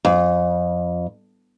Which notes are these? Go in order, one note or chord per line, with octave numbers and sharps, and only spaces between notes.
F2